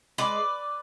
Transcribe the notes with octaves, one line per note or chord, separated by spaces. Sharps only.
G#3 B4 D5